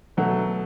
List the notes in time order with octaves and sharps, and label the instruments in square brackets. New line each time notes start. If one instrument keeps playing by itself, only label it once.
[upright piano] B2 F#3 A3